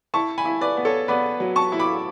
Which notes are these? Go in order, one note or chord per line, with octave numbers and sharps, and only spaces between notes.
E4 A5 C#6
G#5 B5
E4
B4 D5
B3
A4 C#5
B3 B4 D5
F#3
A5 C#6
E4
B5 D6